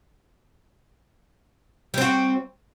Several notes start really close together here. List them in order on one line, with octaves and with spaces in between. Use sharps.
G3 C4 F#4